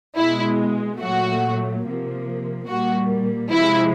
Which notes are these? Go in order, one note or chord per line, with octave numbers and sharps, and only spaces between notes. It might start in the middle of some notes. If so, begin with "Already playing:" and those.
B2 G#3 E4
A#2 F#3 A3 F#4
C3 F3 A#3
A#2 G3 A#3 F#4
C3 F3 G#3 E4